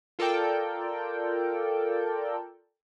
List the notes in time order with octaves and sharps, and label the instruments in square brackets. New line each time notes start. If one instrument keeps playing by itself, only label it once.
[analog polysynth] F4 A4 A#4 D5 G5